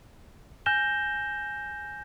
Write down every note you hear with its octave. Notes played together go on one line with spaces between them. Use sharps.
G#5 F6 G6 A#6 E7 G7